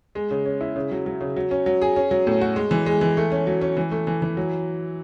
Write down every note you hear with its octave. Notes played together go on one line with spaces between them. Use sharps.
G#3
C#3
C#4
E4
C#3
F#3
F#3
C#3
F#3
C#4
F#3
G#4
C#4
F#3
A2
F#4
G#3
E3
G#3
E3
A3
C#4
F#3
C#4
E3
A3
E3
E3
F#3